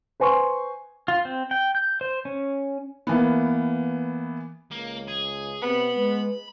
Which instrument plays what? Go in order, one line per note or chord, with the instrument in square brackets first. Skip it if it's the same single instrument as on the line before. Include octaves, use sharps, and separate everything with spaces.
[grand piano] B4 C5 G#5 C6 C#6
[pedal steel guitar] F4
C4
G5
G6
C5
C#4
[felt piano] E3 A#3 B3
[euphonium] C#2 [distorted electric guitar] A#3
[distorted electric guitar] G#4
[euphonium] C3 [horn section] B3 [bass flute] C4 [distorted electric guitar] B5
[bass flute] G#3 [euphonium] B4